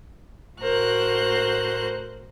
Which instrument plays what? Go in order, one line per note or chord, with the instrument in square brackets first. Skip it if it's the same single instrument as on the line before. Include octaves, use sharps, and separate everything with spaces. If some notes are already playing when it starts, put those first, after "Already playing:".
[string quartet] A2 F#4 A#4 C5 F#6